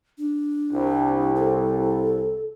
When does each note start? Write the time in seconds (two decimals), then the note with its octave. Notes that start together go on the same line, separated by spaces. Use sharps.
0.18 D4
0.71 C2
1.35 A4